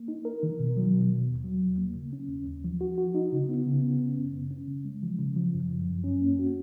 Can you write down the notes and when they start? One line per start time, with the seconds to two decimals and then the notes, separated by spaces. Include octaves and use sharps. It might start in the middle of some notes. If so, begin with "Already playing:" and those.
Already playing: A#3
0.08 D#4
0.25 A#4
0.43 D#3
0.59 B2
0.77 F#3
0.93 B2
1.11 B2
1.27 D#2
1.44 F#3
1.62 D#2
1.78 A#3
1.95 C#3
2.13 C#4
2.29 D#2
2.47 D#2
2.64 F3
2.81 F#4
2.98 F#4
3.15 D#4
3.32 C#3
3.49 B3
3.67 C#3
3.83 B3
4.00 C#4
4.18 F#2
4.33 C#3
4.51 C#4
4.68 C#3
4.85 G#3
5.03 F3
5.19 C#3
5.37 F3
5.54 F#2
5.71 F#2
5.87 F#2
6.04 C#4
6.21 A#3
6.39 F#4